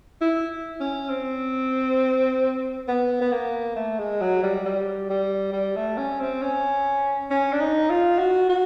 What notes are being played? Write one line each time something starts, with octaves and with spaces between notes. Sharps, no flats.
E4
C#4
C4
B3
B3
A#3
A3
G#3
F#3
G3
G3
G3
G3
A3
C#4
C4
C#4
C#4
D4
D#4
F4
F#4
F#4